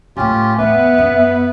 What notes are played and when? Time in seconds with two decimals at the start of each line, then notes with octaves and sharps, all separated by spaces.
0.17 A2 A3 C#4 F4 G4
0.58 E2 D#3 B3 B4 E5
0.98 F#2